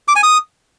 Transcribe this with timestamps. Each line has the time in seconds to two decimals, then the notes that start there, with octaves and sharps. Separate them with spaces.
0.08 D6
0.16 G#5
0.23 D#6